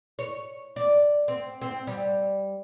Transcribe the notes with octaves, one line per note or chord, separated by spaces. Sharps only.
C#5
D5
C4
C4
G3